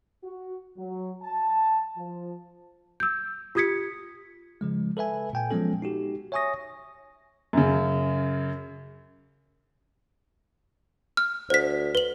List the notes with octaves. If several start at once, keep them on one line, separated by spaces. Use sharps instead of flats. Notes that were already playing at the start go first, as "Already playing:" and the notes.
F#4
F#3
A5
F3
E6 G6
F4 G4 D#6 G#6 B6 C#7
C#3 F3 G#3
A4 B4 E5 G#5
A#2 G5 G#5
F3 F#3 G#3 B3 C#4 A4
D#4 F#4 G4
C#5 E5 G#5 C#6 D#6 A#6
F#2 C#3
F6
D2 C5 B6
B4 F#7